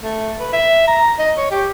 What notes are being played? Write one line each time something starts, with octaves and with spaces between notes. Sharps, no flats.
A3
B4
E5
A#5
D#5
C#5
G4